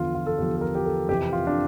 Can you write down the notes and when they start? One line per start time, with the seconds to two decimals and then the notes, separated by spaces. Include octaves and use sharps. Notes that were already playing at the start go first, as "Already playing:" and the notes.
Already playing: E2 D3 F3 F4
0.15 F4
0.26 A4
0.38 E2 D3 F3 G4
0.57 A4
0.61 A#4
0.75 G4
0.85 A4
1.08 F2 C3 E3 G4
1.32 F4
1.47 D4